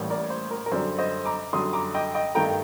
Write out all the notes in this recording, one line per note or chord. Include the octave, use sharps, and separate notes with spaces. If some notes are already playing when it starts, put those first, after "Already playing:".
Already playing: A1 A2 G3 A#3
A#4 D5
C5
A#4
A#4
F#2 D3 G3 C5
C5 D#5
A#5 D6
F#2 D3 G3 C6 D#6
A#5 D6
D#5 G5
D#5 G5
G2 D#3 A3 G5 A#5